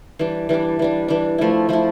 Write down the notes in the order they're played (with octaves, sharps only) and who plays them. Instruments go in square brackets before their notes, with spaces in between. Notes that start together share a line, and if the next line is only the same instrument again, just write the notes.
[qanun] E3 G3 D4
E3 G3 D4
E3 G3 D4
E3 G3 D4
F3 A3 E4
F3 A3 E4